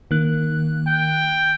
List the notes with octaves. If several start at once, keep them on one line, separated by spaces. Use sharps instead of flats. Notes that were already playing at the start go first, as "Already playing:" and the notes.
D#3 A#3 F#6
G5